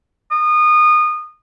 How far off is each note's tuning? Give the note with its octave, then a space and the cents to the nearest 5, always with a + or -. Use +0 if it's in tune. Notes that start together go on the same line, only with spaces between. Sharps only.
D#6 -25